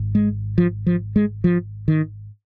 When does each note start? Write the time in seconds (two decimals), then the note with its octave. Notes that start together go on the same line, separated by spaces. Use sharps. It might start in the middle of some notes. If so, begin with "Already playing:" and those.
Already playing: G#1 G#2
0.15 G#3
0.58 F3
0.87 F3
1.16 G#3
1.44 F3
1.88 D#3